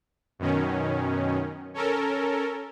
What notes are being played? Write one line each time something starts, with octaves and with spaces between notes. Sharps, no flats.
F#2 B2 D#3 C#4
C#4 A4 A#4